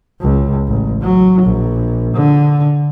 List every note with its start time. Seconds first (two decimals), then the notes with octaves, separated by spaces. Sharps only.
0.21 C#2
0.68 A1
1.02 F#3
1.42 A#1
2.14 D3